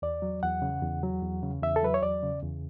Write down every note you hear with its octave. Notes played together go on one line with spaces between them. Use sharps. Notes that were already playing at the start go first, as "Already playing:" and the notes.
E2 D5
F#3
E2 F#5
C#3
E2
F#3
E2
C#3
E2 E5
A4
F#3 B4
C#5
E2 D5
C#3
E2